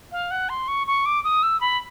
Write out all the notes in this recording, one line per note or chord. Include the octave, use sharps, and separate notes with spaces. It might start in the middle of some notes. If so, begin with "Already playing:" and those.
F5
F#5
C6
C#6
C#6
D6
D#6
E6
B5